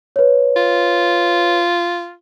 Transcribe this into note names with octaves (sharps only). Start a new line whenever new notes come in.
B4 C#5
F4